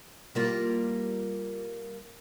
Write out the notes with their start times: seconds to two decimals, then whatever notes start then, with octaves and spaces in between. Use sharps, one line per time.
0.35 G3 A#3 F4